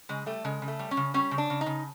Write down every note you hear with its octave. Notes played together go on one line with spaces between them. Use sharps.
C#3 G#3
G3 A3
C#3 G#3
C#3
A3
G3
C#4
C#3
G3 C#4
C#3
D4
C#3
D#4
C#3